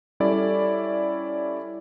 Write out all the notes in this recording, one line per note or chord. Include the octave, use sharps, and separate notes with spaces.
G3 C#4 E4 A4 D5